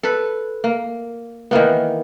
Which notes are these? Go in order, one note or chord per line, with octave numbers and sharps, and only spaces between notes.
A4 B4
A#3
D#3 E3 A#3 B3